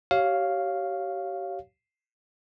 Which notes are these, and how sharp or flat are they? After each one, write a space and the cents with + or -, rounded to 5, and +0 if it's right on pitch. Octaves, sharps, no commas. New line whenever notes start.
G4 -35 C#5 +0 F5 +0